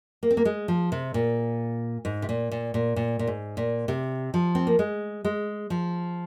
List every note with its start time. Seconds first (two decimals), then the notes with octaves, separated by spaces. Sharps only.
0.23 A#3
0.31 C4
0.37 A#3
0.45 G#3
0.68 F3
0.92 C3
1.14 A#2
2.05 G#2
2.22 C3
2.29 A#2
2.52 A#2
2.74 A#2
2.96 A#2
3.19 A#2
3.27 G#2
3.57 A#2
3.88 C3
4.34 F3
4.55 C4
4.67 A#3
4.79 G#3
5.25 G#3
5.70 F3